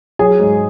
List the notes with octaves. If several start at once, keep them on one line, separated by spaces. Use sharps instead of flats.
F#3 G#4 G#5
G#2